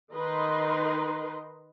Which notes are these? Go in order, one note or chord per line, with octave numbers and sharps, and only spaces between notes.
D#3 D#4 A#4 B4 D#5 C6